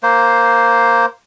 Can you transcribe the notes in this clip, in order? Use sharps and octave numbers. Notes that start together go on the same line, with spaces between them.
A#3 C5